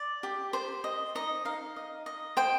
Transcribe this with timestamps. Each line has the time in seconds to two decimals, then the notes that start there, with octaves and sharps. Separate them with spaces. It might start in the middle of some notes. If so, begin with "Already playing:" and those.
Already playing: D5
0.23 G4
0.53 C5
0.84 D#5
1.15 D#4 D#5
1.45 D#4 F5
1.76 D#5
2.06 D#5
2.37 C5 G5